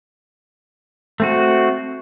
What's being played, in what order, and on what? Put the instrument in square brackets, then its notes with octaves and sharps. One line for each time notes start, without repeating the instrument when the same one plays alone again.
[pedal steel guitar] A3 C4 F#4